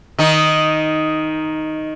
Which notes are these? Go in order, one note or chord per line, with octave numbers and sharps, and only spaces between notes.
D#3 D#4